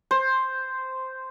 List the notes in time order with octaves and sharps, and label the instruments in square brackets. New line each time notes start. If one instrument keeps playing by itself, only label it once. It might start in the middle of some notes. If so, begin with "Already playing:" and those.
[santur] C5